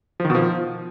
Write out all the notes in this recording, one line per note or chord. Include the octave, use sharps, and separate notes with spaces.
F3
D#3
B2
F3